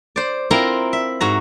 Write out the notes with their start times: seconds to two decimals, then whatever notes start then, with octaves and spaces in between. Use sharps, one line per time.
0.16 C5 D5
0.51 C4 E4 F4 A#4 A#5
0.93 E5
1.21 G#2 F#4 A#5